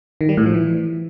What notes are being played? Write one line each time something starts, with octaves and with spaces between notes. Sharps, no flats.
D#3
G3
A2
F3
E3